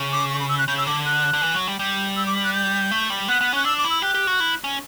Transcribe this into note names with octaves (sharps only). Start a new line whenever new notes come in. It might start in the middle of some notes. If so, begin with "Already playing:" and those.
Already playing: C#3
D6
C#6
B5
E6
F#6
C#3 G6
E6
D3 D6
F#6
D3
E3
F#3
G3
G3 G6
E6
D6
F#6
G6
A3
G3
B3 F#6
B3
C#4 F#6
D4 E6
D6
E4
E6
G4 F#6
G4
F#4
E4
C#4